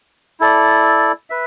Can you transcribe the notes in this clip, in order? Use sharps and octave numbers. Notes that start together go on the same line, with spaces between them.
E4 A4 D5
B4 E5